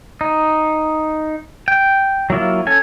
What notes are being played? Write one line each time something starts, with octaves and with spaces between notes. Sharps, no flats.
D#4
G5
F#3 A#3 E4 F4
C#4 A4 G#5